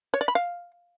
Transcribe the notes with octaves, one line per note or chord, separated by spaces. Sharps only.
C#5
D5
B5
F5